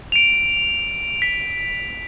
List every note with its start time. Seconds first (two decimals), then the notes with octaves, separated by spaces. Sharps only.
0.12 D7 D#7 F7
1.22 B6